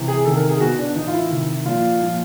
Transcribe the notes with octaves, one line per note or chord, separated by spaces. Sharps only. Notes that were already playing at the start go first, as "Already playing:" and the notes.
Already playing: C3 E3
G#4
C3 D#3 A4
A#4
G#4
B2 F#4
D4
A2 E3 D#4
F4
E4
C3 D#3
A#2 F3 F4
A#2 F3